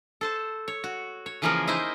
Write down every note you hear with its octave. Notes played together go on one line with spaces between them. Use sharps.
A4 C5 A5
C#5
F#4
C#5
C#3 E3 F3 A#3 G#4 A#4
D#4 E4 C5 D#5